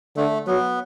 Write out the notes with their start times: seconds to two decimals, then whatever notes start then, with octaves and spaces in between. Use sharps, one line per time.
0.17 D3 A3
0.47 F#3 B3